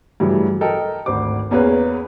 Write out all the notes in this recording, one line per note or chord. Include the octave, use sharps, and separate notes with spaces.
G2 C#3 E3 F#3 A3
A4 A#4 D#5 G5 A5
G#1 D2 C5 D6
E2 A#3 C#4 G#4 B4